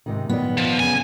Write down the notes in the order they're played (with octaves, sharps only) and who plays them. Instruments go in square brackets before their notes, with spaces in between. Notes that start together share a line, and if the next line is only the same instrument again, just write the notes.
[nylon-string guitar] G#2 C3 D#3
[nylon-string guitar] A#2 D#3 D5 [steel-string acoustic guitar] B3
[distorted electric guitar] F3
[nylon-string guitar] F#2 C#3 [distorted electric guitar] G#5